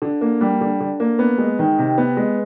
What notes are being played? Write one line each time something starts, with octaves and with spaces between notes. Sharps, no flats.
D3
A#3
G3
D3
D3
A#3
B3
G#3
D#3
C3
B3
G#3